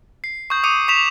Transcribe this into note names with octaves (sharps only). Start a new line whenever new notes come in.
C7
C#6 D#6 G6
D6 D#6 G6 C#7 D#7
C#6 B6 E7 F7